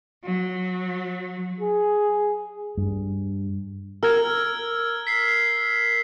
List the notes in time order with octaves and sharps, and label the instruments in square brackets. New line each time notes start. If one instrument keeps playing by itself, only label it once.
[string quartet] F#3
[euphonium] G#4
[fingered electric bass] G2
[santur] A#4 [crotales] E6 F6 G#6
[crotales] B6 C7